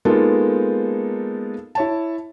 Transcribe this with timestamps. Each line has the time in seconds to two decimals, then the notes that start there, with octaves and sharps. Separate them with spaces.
0.05 G#3 A#3 B3 D#4 F4 A4
1.75 E4 C#5 A5